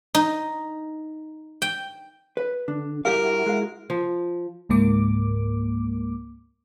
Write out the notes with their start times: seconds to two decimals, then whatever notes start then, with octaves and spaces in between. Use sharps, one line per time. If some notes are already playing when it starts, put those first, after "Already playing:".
0.15 D#4
1.62 G5
2.37 B4
2.68 D3 D4
3.05 G2 E4 F#4 G4 A#4 F5
3.46 G#3 F5
3.90 F3
4.69 C#2 G#2 A#3 D6